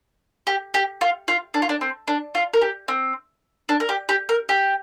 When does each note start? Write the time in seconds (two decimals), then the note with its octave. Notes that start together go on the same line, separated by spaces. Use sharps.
0.47 G4
0.74 G4
1.01 F4
1.28 F4
1.54 D4
1.62 F4
1.69 D4
1.81 C4
2.08 D4
2.35 F4
2.53 A#4
2.61 G4
2.88 C4
3.69 D4
3.80 A#4
3.89 G4
4.09 G4
4.29 A#4
4.49 G4